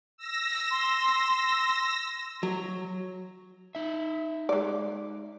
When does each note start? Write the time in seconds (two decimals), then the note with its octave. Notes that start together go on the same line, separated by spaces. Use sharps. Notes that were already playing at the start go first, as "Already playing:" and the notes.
0.17 E6 A#6
0.71 C6
2.43 F#3
3.75 D#4 E5
4.49 G#3 D5